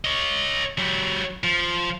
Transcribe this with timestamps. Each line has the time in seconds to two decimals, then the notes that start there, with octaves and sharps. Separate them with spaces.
0.05 C#5 D#5
0.78 F#3 G4
1.44 F3